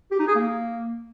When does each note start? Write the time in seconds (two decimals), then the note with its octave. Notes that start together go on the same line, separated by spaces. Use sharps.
0.11 G4
0.19 D#4
0.27 G#4
0.35 A#3